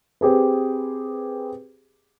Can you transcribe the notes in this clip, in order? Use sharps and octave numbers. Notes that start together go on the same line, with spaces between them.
C4 G4 G#4 B4